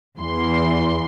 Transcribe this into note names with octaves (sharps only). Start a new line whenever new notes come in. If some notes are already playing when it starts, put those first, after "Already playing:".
E2 C6